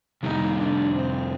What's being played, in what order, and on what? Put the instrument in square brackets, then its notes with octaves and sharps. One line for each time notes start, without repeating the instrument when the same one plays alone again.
[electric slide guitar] F2 C3 G3 [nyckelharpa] D#4
[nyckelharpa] D4
C4